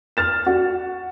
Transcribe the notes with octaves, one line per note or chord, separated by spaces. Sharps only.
F6 A6 E7
F#4